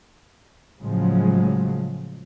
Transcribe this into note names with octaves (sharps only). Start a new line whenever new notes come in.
A2 C#3 F3 F#3 G#3